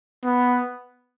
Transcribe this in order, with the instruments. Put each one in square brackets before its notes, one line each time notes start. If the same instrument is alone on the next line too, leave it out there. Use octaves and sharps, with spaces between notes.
[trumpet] B3